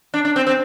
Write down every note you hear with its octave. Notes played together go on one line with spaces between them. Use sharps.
D4
D4
C4
C4